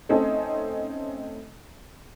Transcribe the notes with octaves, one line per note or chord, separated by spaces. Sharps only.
A3 C4 C#4 D#4 A4